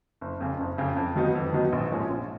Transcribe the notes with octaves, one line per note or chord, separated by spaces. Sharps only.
F#1
F2 C#3
F#1
F2 C#3
F2
D#3 F#3 B3 D#4
F2
D#3 F#3 B3 D#4
A#1
A#2 F3 G#3 C#4
A#1